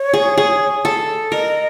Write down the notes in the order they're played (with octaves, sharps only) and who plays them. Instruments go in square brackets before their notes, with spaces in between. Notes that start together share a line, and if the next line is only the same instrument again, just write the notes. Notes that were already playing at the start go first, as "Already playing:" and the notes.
Already playing: [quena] C#5
[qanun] G#4
G#4
A4
[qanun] A#4 [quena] D#5